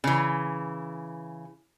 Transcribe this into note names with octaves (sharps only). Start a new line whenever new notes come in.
C#3 E3